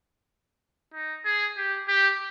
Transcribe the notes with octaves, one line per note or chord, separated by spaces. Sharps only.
D#4
G#4
G4
G4